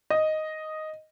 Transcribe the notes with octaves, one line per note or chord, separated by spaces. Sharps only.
D#5